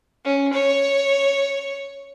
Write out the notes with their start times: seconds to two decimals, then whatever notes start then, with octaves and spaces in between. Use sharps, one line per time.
0.25 C#4
0.53 C#5